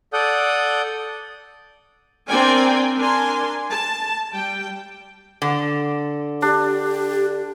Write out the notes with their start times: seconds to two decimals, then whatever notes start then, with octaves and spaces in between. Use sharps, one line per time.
0.13 A4 D5 F#5 D#6 G6
2.28 C4 D4 A#4 D5 G5 G#5
2.97 D4 A#4 G#5 C6
3.71 A5
4.33 G3 G5
5.42 D3
6.42 D4 G4